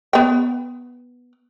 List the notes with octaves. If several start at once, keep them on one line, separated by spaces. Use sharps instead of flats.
B3 G5